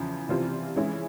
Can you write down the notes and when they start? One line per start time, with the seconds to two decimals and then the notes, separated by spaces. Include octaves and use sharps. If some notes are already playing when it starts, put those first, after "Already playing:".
Already playing: E2 C#3 F3
0.29 C3 E3 G3 C4 F4
0.76 E3 G#3 C#4 E4 G#4